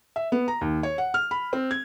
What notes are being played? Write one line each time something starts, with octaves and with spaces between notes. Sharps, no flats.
E5
B3
A#5
D#2
C#5
F#5
F6
B5
C4
G#6